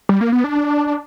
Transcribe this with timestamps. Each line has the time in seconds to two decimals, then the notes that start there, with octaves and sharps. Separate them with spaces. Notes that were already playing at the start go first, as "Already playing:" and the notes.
0.09 G3
0.21 A#3
0.33 B3
0.44 D4
0.56 D4